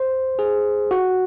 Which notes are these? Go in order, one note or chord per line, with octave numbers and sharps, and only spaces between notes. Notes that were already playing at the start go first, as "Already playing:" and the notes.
Already playing: C5
G#4
F#4